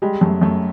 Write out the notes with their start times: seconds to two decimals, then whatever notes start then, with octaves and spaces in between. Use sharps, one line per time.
0.02 G3 G#3
0.21 F#2 A3
0.42 F#2 A3